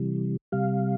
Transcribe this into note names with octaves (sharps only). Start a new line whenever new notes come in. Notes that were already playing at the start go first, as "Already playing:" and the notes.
Already playing: C3 E3 G3
C3 G3 F5